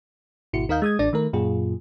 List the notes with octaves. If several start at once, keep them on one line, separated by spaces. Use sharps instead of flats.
G#1 B2 E4 F#4 C#7
D#2 D#4 A#4 D#5 F5 G6
G#3 D#6 G#6
A1 D4 D5 A6
D#3 A3 A#4
F#2 A#2 F4 G#4